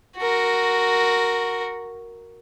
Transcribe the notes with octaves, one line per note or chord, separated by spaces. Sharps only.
F#4 A#4